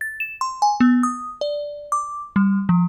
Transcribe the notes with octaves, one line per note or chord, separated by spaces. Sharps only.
A6
E7
C6
G#5
B3
D#6
D5
D6
G3
F3